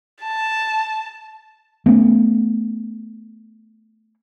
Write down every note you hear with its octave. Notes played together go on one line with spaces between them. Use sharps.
A5
A3 B3 C#4